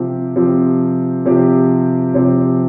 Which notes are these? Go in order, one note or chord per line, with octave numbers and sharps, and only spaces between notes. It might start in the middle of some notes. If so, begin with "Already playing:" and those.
Already playing: C3 F3 C4 G4
C3 F3 C4 G4
C3 F3 C4 G4
C3 F3 C4 G4